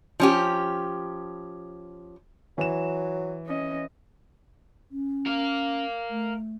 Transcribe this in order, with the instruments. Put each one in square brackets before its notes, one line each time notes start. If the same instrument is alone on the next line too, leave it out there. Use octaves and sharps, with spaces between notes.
[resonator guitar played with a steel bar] F3 C#4 G4
[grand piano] E3 E7 [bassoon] F#3
[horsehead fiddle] C#4 D#5
[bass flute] C#4
[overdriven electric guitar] A#4 F5
[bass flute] A3